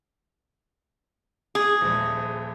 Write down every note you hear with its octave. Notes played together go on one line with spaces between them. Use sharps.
G#4
D#1 A#1